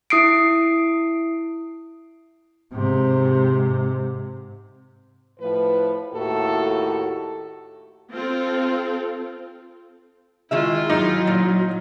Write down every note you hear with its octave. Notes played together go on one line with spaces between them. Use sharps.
E4 D#6 C7 D7
G#2 C3
A2 F3 B4
D#2 A2 F#4 G4 A4
C4 F4 A4
D#3 G#3 E4 F4 E5
F#3 D#4
A#2